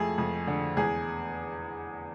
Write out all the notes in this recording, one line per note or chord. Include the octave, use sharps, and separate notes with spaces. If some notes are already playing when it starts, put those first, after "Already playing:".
Already playing: F2 F3 A3 G#4
F2
D3
E2 G#4